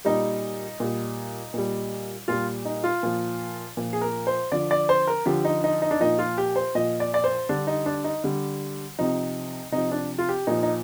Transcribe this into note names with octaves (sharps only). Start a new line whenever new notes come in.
A#2 G3 D#4
A#2 G3
A#2 G3
A#2 G3 F4
D#4
F4
A#2 F3
A#2 F3
G#4
A#4
C5
D3 F3 D5
D5
C5
A#4
D3 F3 G4
D#4
D#4
D#4
D4
A#2 F3 D#4
F4
G4
C5
A#2 F3 D#5
D5
D5
C5
D3 G3 D4
D#4
D4
D#4
D3 G3
C3 F3 D#4
C3 F3 D#4
D4
F4
G4
A#2 F3 D#4
D#4